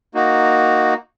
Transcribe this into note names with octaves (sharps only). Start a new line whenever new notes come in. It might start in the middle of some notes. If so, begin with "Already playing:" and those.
A#3 D#4 F#4